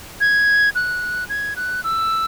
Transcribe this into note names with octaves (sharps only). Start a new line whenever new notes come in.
G#6
F#6
G#6
F#6
E6